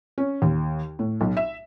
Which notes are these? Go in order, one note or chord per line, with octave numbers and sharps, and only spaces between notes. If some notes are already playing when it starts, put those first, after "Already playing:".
C#4
D#2
A2
B1
E5